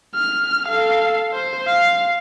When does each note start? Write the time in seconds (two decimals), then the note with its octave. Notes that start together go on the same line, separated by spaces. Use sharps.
0.15 F6
0.68 A4 F5
1.33 C5
1.67 F5